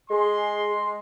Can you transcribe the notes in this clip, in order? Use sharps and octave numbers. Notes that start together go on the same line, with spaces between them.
G#3 G#4 C6